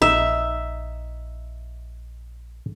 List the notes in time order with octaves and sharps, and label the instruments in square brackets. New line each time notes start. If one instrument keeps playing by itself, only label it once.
[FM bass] A#1 [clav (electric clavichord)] D#4 [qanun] E5